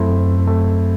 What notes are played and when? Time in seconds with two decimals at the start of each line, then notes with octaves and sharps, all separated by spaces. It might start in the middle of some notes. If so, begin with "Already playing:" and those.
Already playing: F#2 A3 C4 E4 A4
0.47 A3